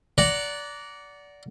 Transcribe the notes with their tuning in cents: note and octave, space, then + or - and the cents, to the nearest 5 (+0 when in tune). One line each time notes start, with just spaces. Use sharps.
D5 -20 F#5 +0 A#5 -5